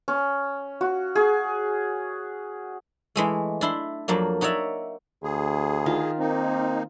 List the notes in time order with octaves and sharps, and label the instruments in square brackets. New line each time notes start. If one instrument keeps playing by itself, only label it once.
[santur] C#4
F#4
G#4
[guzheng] E3 G#3 A3
D4 E4 C6
F2 F#3 A#3 D4
D#4 F#4 C#5 D5 E5
[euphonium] D2 [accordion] G#4
[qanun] D#3 F4
[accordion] A#3 D#4 [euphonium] C4